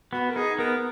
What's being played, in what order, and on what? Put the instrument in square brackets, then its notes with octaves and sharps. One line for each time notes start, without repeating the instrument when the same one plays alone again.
[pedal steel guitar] B3 [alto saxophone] F#4
[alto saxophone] A#4
[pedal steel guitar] D#4 [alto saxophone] G#4
[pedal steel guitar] B3 [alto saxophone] A#4